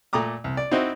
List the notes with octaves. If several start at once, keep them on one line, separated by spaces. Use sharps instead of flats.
A#2 A3 A#5 D6 D#6
C2
D5
C4 D#4 E4 F#4 C5